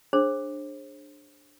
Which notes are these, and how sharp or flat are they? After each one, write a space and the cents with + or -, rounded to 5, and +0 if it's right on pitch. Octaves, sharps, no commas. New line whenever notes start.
D4 +10 G#4 +0 C5 +35